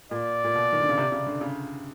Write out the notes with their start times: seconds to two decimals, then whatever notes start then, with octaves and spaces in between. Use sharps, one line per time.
0.11 A#2 D5
0.44 A#2
0.55 B2
0.73 D#3
0.81 D3
0.89 C#3
0.98 C3
1.12 C#3
1.27 D3
1.41 C#3